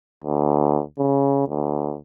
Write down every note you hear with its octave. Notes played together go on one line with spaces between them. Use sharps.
D2
C#3
D2